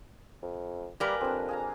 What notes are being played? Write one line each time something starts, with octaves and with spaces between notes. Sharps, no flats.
F2
G3 A#3 G4 A#4 B4 F5 G#5
F2 C4 D4
G#4 F5 A#5